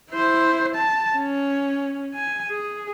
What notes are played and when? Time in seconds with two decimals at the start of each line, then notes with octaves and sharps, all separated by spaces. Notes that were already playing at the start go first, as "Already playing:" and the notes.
0.11 E4 C5
0.75 A5
1.16 C#4
2.14 G#5
2.49 G#4